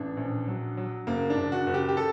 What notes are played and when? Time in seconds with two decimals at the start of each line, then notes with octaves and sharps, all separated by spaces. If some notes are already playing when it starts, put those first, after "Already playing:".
Already playing: A1 D4
0.17 A#1
0.47 F#3
0.77 F#3
1.07 F#1 A#3
1.30 D4
1.37 F#1
1.52 F#4
1.67 F#1
1.74 G4
1.89 G4
1.97 A4